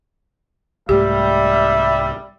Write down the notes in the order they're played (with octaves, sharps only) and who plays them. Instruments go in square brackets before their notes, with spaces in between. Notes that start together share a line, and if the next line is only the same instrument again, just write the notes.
[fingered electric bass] C2 G#2 A3 [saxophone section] G3 [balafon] G4 [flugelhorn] E5